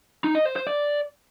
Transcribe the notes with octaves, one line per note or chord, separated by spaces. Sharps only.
D#4
D#5
C5
C5
D5